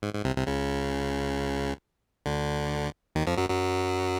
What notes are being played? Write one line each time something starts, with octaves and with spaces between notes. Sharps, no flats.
G#2
G#2
C2 C3
C2 C3
C#2 C#3
D2 D3
D#2 D#3
F2 F3
F#2 F#3
F#2 F#3